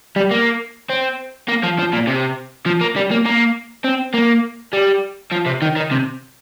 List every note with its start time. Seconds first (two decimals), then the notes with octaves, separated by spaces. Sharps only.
0.16 G3
0.31 A#3
0.90 C4
1.48 A#3
1.63 F3
1.79 F3
1.93 A#2
2.07 C3
2.66 F3
2.81 A#3
2.96 G3
3.11 A#3
3.26 A#3
3.84 C4
4.14 A#3
4.73 G3
5.32 F3
5.46 C3
5.62 D#3
5.76 D#3
5.91 C3